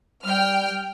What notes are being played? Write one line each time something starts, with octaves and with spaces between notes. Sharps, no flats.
G3 G5 F6